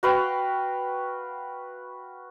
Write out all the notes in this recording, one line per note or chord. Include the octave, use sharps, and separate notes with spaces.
F#4 B4 F5 G5